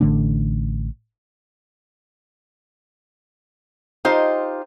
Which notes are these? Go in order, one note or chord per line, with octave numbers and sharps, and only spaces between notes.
A1 D3 A3 D4
D#4 F4 G4 C5 D#5